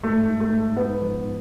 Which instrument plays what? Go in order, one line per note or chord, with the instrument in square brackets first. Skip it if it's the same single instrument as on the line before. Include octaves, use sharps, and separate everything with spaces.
[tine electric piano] G#2 [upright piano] A3
[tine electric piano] G#2
[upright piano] A3
[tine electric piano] G#2
[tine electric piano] G#2 [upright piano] B3
[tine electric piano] F3